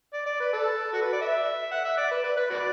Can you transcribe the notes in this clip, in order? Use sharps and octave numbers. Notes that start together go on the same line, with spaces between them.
D5
D5
B4
A4
F#4
B4
D5
E5
F#5
E5
D5
B4
B4
B4
F#4 B4 D5